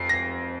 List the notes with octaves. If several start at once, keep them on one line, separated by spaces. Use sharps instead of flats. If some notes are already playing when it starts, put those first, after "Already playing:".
Already playing: F2 C7
A#6